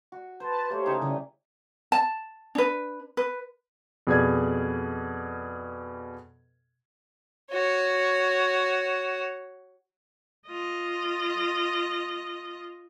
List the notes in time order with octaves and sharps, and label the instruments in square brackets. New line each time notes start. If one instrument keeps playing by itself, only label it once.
[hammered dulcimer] F#4
[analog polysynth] B4 A5 [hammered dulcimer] C5
[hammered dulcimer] A3 A#3 [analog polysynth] G4 C5 C#5
[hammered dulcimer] C#3 E3 D#4
[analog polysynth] C#3 [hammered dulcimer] E3 G3 D#5
[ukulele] A5
D4 B4
B4
[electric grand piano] F2 B2 G#4 B4 D5 G#6
[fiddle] F#4 C#5
[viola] F4 D#5